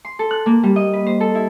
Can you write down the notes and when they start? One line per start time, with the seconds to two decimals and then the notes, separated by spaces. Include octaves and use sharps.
0.05 C6
0.19 A4
0.31 F#6
0.46 A#3
0.63 G3
0.76 D#5
0.93 B4
1.06 C5
1.20 A4
1.35 E4